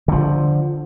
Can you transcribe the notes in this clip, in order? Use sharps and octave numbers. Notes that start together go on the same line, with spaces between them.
D3 F3